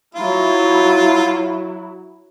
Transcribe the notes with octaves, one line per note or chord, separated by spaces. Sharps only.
F#3 E4 F4